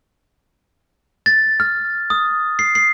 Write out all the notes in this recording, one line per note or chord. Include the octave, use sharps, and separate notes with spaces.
A6
F6
D#6
C7
C7